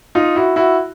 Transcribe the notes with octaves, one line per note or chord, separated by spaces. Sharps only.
D#4 F4
E4 F#4
E4 F#4